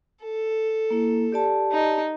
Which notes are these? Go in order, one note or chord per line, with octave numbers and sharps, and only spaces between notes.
A4
A#3 E4
G4 D5 A5
D#4